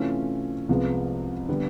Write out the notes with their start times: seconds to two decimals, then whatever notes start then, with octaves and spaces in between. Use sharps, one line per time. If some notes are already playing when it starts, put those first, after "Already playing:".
Already playing: C3 E3 A3 C#4 F4
0.69 C2 C3 F3 G#3 B3
1.49 D3 G3 B3